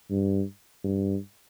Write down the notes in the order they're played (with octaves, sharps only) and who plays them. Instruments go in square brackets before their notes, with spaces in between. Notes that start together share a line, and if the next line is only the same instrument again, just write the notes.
[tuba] G2
G2